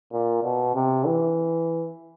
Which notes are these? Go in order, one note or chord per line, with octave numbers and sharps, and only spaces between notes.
A#2
B2
C3
E3